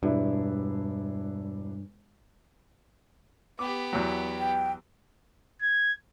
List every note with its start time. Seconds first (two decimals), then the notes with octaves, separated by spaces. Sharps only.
0.03 E1 G2 D4 E4
3.59 B3 G4 D6
3.93 E2 F#3
4.39 G5
5.62 G#6